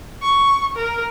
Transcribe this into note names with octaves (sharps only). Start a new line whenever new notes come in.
C#6
A#4